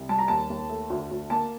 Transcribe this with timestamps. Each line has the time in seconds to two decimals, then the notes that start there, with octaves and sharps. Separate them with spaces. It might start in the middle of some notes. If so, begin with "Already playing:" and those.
Already playing: C2
0.09 G3 A5
0.18 A#5
0.28 D#2 A5
0.50 D#2
0.69 A3
0.90 D2
1.11 D2
1.30 A#3 A5